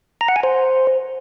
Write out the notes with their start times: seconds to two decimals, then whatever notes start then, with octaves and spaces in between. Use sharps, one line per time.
0.21 A#5
0.28 F#5
0.36 G#5
0.43 C5